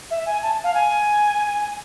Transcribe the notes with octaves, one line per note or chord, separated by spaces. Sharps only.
E5
G#5
A5
F5
G#5